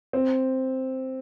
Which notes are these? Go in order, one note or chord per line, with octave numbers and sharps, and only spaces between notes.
C4